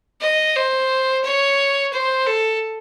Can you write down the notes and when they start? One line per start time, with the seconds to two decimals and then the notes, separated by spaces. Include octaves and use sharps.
0.21 D#5
0.55 C5
1.24 C#5
1.93 C5
2.26 A4